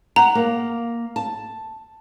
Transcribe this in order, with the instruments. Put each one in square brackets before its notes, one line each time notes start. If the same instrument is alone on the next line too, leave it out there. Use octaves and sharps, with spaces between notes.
[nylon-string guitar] F#5 [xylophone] A#5
[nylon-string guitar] A#3
A5